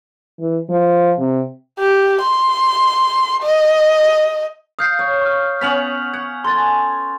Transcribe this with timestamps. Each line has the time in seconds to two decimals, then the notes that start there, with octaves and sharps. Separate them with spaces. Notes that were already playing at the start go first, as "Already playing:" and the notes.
0.39 E3
0.70 F3
1.19 C3
1.79 G4
2.22 C6
3.42 D#5
4.79 F5 D#6 G6 C7
4.99 C#5
5.21 C#6 F6
5.61 B3 C#4 F#5 B6 F7 F#7
6.13 F#5 G#6
6.44 A4 G#5 C6 A6